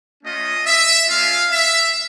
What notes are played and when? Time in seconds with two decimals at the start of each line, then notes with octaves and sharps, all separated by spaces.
0.24 A3 C#4 F4 D#5
0.66 E5
1.09 G#3 C#4 F4 F5
1.52 E5